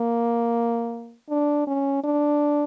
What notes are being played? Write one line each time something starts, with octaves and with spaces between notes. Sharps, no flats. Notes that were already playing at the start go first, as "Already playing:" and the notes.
Already playing: A#3
D4
C#4
D4